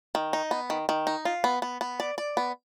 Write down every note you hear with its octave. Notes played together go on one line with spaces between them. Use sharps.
D#3
D#4
B3
D#3
D#3
D#4
F4
B3
B3
B3
D5
D5
B3